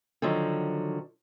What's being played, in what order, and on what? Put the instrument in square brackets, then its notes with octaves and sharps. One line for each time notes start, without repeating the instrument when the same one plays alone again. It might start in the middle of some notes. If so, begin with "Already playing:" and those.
[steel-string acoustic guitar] D3 D#3 F3 F#3